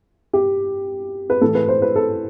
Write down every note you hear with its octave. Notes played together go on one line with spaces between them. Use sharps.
G4
B4
A2 E3 A4
B4
C5
B4
A4